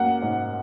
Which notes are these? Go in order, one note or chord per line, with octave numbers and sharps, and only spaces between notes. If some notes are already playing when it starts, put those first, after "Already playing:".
Already playing: F#2 A#3 F#5
G#2